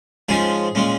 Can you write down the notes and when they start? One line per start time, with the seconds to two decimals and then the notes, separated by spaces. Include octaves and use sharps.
0.29 G#2 F3 G#3 C#4 G#4
0.75 A#2 G#3 C#4